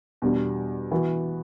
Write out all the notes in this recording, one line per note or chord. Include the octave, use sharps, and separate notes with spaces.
E2 B2 G3 D4
E3 B3 F#4